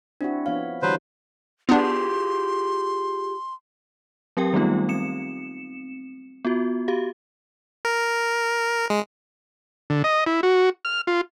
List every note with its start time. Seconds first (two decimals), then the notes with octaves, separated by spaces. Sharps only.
0.21 C4 D4 E4 F#4
0.46 F3 B3 C#5 F5
0.82 D3 E3 F#3 G3 B4 C5
1.69 B3 D4 F4 G4 G#4 C6
4.37 F#3 C4 G4 A#4 G5
4.53 D#3 G3 A3 B3 D#4 F4
4.89 C4 C#7 E7
6.45 B3 F4 F#4
6.88 F#4 G4 F5
7.85 A#4
8.90 G#3
9.90 D3
10.04 D#5
10.27 E4
10.43 F#4
10.85 F6
11.07 F4